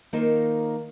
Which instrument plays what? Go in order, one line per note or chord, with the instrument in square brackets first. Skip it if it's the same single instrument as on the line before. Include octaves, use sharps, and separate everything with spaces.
[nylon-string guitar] D#3 A#3 D#4 F4 A#4 C5